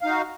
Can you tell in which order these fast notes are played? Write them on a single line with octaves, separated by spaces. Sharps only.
F5 D#4 F#4